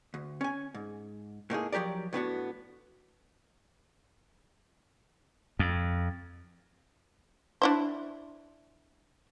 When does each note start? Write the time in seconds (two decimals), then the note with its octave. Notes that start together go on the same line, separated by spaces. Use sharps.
0.14 D2
0.41 C#4 G#5
0.74 G#2
1.50 A2 A#3 D#4 G#4
1.72 F3 F#3 G4 A#4 D5
2.13 A2 B3 D4 F#4
5.59 F2
7.62 D4 E4 C5